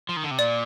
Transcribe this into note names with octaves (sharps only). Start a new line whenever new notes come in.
F3
D#3
D3
C3
A#2 D5